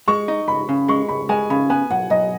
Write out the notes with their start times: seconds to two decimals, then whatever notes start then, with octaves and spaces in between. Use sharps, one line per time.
0.08 G#3 C#6
0.28 D#4
0.48 C#2 B5
0.69 C#3
0.88 G#3 C#6
1.08 C#2 B5
1.29 G#3 G#5
1.50 C#3 B5
1.70 B3 G#5
1.90 B1 F#5
2.10 B1 D#5